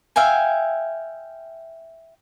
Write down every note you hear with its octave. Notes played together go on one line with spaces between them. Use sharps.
E5 F5 G5 G#5